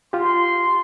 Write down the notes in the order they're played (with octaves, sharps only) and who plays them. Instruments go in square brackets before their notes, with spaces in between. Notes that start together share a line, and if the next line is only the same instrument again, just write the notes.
[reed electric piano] F4 G4 [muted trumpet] C6